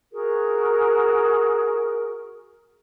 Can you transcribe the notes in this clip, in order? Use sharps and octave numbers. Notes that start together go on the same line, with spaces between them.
F#4 G#4 A#4